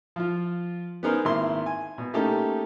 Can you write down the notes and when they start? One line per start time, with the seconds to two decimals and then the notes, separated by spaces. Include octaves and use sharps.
0.16 F3 F4
1.03 B3 C#4 D#4 G#4 A#4 C5
1.25 G#1 A#3 E4 C6
1.66 G#5
1.98 B2
2.14 A3 A#3 C#4 D#4 G4 A5